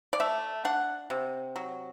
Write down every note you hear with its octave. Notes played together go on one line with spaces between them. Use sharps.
D5
A3 E5
D4 F#5
C3
F#3